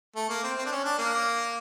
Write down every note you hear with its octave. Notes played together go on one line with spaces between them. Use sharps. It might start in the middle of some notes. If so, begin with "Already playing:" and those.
A3
A#3
C4
C4
D4
C#4
D4
A#3